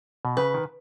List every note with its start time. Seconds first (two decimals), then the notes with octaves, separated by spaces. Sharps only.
0.25 B2
0.37 C#3 B4
0.54 D#3